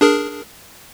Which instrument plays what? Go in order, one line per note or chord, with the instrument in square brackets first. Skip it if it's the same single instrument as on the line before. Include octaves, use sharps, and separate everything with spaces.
[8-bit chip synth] D4 G#4 A#4